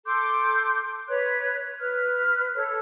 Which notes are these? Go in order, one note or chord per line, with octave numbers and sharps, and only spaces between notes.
A4 C6 D6 G6
B4 C#5 F#6
B4 F6 F#6
A4 C#5